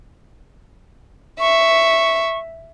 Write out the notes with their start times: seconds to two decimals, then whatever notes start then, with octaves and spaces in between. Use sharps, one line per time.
1.40 E5 C#6